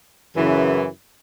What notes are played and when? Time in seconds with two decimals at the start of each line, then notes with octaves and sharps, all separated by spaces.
0.36 F#2 C#3 E3